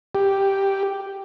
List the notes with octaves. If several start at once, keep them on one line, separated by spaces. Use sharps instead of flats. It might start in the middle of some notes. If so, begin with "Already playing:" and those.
G4